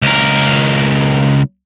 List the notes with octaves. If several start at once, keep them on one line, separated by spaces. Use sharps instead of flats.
C#2 A#4